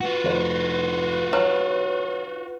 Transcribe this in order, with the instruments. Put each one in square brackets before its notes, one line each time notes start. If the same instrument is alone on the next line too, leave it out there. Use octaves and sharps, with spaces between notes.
[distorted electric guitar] F4 F#4 [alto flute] B4
[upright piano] F1 C5
[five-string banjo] F#3 [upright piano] F6 F#6 E7